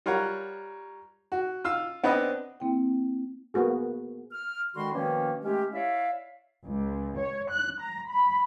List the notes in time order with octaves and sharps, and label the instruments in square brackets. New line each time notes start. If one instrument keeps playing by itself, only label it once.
[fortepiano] G3 F4 A#4 C#5 F#5
F#4
F4 F5 E6
B3 C4 D4 B4 D#5
[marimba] A#3 C4 E4 G5
[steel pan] A#3 B3 F#4 G#4
[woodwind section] F6
D3 D#3 G#3 F#4 B5 C6
B2 D#3 F3 A#3 C#4
D#3 G#3 A3 C#4 G4
E4 C#5 D5 E5 F5
[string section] C#2
C#5
F#6
A#5
B5